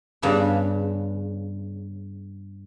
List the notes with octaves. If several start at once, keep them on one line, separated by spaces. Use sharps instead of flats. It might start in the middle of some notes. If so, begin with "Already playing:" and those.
G2 C#3 B3 D4